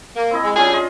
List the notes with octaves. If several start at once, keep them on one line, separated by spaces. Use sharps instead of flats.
A#3
C4 E4 D#5
G#3
G3 C#4 D4 F4 G#4
F4 D#5 C6